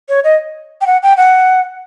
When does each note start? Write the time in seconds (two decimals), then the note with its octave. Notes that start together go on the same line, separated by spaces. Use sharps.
0.09 C#5
0.24 D#5
0.81 G5
0.86 F#5
1.03 G5
1.17 F#5